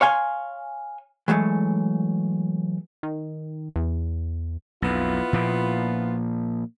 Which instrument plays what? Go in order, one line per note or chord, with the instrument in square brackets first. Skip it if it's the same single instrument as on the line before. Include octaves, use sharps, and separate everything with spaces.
[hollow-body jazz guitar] C#5 F5 G#5 C6
E3 F#3 G#3 A3
[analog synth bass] D#3
E2
[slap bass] B1 F2 [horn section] B3 E4 F4
[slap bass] A#2 F3 A#3